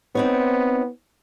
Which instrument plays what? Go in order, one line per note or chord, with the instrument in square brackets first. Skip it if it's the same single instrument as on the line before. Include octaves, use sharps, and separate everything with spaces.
[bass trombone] B3 [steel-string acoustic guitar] C4 D#4 C#5